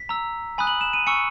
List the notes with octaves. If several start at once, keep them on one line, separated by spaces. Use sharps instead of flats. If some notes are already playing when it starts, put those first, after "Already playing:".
Already playing: B6
A#5 E6
G#5 B5 D#6 F#6
F#7
E7
D#7
G#5 C#6 E6 C#7